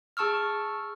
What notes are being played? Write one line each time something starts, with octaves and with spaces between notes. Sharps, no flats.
G#4 A5 C#6 E6 F6